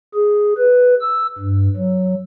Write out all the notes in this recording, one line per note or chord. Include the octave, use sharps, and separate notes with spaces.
G#4
B4
E6
G2
F#3